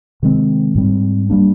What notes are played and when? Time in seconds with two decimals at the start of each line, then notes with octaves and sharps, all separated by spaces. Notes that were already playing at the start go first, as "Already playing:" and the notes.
0.23 C3 D#3 G#3 C4
0.75 G#2 G3 C4
1.30 G3 A#3 D4